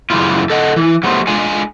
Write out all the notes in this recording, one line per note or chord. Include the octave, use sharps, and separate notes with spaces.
F#2 C#3 E3 G3 E4 F4
A4 D#5 F#5
E3
F#3 G3 A3 B3 C5
G#3 D4 F4 G#4 G#5